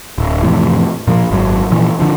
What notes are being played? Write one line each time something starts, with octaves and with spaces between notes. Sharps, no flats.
D1
F2 A2 C3 E3
A#2 F3 G3 A#3
G#1 F#2 F#3
A#2 E3 F3
D3 F3